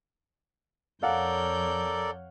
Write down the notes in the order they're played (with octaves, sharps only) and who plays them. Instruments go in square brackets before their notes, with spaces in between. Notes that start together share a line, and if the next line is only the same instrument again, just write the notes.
[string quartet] F2 C#5 G6 [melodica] A4 A#4 D5 [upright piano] F5 F#5